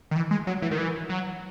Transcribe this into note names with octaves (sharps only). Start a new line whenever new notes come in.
D#3
E3
G#3
F#3
E3
D#3
E3
F#3